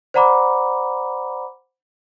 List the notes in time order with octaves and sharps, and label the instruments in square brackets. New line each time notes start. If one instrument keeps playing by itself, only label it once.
[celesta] C5 D5 F#5 A#5 B5 D6